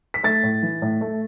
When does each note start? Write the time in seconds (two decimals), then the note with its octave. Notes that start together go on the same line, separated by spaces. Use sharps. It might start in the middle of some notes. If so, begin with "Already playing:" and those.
0.14 B6
0.24 A3 A6
0.43 A2
0.63 E3
0.82 A2
1.01 A3